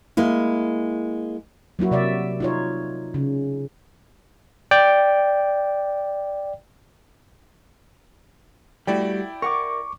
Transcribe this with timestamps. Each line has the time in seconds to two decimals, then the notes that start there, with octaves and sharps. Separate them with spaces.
0.17 G#3 A#3 E4
1.79 F#3 A#3 E4 F#4
1.91 C3 D5 E5
2.40 D#4 F4 C#5
3.14 C#3
4.71 D5 G5
8.87 G3 A3 E4 F#4 D5 G5
9.42 A#4 F#5 C#6 D6